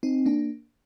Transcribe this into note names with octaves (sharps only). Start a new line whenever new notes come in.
C4 D#4
A#3 D4